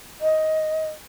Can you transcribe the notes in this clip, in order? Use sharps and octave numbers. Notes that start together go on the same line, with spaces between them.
D#5